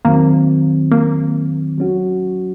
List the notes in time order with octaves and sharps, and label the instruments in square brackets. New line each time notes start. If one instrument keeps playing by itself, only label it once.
[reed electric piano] F2 D#3 F#3 C4 [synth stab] A#3
[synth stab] A#3
[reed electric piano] F#3 C#4 F#4